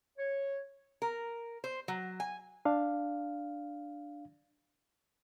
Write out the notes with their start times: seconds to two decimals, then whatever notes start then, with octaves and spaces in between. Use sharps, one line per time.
0.18 C#5
1.02 A#4
1.64 C5
1.88 F#3
2.20 G#5
2.65 D4 F5